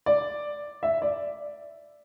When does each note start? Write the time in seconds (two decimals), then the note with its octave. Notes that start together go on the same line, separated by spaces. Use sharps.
0.06 D5
0.83 E5
1.02 D5